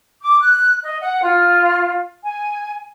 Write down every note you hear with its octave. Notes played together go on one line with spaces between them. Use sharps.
D6
F#6
D#5
F#5
F4
G#5